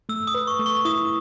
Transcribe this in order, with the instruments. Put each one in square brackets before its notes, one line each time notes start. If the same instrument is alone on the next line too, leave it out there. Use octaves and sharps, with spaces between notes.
[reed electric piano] A3 [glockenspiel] E6
[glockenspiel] D#6
[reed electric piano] B4
[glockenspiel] C#6
[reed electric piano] A3
[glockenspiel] C#6
[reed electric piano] E4 [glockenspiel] D#6